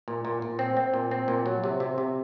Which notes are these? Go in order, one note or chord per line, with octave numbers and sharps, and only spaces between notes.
A#2
A#2
A#2
C4
C4
A#2
C4
A#2
F#3
C3
C3
C3